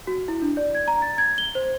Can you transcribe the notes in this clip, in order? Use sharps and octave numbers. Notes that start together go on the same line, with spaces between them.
F#4
E4
D4
D5
G#6
A#5
A6
G#6
G7
C5